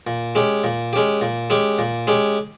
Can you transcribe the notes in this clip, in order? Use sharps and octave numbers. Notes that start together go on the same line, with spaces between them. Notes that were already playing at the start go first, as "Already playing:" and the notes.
A#2
G#3 C#4 G4
A#2
G#3 C#4 G4
A#2
G#3 C#4 G4
A#2
G#3 C#4 G4